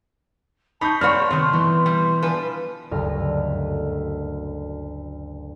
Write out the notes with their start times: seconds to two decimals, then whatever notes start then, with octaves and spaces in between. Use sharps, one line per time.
0.81 D#4 A5 B5 C#6 G6
1.01 C4 F#4 C#5 D5 F#5 G5 C6 F6
1.31 C3 D#3 A3
1.50 B2 E3
1.86 G3
2.22 F3 D4 B4 G#5
2.91 F#1 D2 G2 A3 D#5 F6